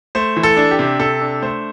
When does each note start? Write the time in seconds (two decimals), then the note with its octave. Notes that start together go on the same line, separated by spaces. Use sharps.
0.15 A3 C5
0.36 E3
0.43 A4
0.57 D4
0.71 G4
0.79 C3
0.99 C3 A4
1.21 D4
1.42 A3 C5